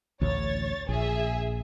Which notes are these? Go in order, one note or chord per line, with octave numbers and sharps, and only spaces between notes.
A1 D2 C#5 A6
A#1 G#4 E5